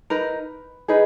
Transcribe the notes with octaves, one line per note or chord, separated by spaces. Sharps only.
D#4 A#4 B4
D#4 G#4 B4